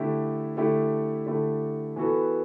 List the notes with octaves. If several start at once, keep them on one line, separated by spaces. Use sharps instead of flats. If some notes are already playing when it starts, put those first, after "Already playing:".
Already playing: D3 A3 E4 G4
D3 A3 E4 G4
D3 A3 E4 G4
E3 B3 F#4 A4